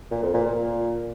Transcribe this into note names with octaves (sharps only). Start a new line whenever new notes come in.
A#2
F2
A#2
A#2